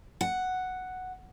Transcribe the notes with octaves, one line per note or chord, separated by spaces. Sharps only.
F#5